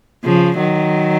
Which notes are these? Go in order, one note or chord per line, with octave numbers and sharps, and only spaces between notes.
C#3 F3
D#3 F#3